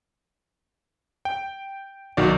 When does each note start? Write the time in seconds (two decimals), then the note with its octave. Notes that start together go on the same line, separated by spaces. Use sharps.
1.25 G5
2.17 B1 D#3 F#4 D5